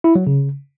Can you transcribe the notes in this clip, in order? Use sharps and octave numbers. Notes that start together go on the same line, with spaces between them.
E4
F#3
C#3